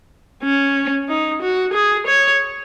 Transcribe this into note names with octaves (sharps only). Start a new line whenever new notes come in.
C#4
D#4
F#4
G#4
C#5